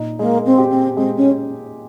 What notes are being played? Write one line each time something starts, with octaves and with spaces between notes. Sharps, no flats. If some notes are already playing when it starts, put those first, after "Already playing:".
Already playing: A#2 D#4
G#3 A#3
C4
G4
C4
G#3 C4
C#4